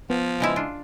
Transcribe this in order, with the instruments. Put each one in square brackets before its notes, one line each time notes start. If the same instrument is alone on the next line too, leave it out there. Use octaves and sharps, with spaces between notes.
[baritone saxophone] F3 [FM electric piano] B3
[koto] C#3 G#3 E4
D4 F4